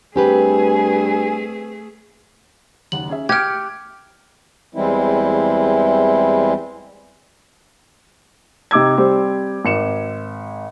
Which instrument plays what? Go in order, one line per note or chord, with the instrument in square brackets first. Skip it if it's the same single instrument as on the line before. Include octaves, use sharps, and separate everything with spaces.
[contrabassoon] G2 [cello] A3 G#4 [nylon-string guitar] C4 G4 B4 [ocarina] G#5
[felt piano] F#1 D#2 F#5 [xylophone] F#7
[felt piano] C#4 G#4 E5
[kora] G4 [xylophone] F6 G#6 [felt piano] F#6 C#7 D7
[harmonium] E2 E3 G3 G#3 C4 E4
[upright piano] C3 D#4 D6 E6 G#6
G3 C4 G4 C5
G#1 C#7 E7